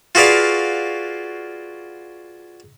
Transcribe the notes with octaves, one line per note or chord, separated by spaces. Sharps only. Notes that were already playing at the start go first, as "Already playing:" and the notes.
F4 F#4 G#4 B4 D5 F5